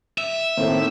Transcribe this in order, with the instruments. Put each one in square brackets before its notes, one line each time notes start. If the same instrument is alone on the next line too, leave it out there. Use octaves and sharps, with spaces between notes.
[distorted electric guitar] E5
[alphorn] A2 [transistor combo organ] D#3 A#3 C4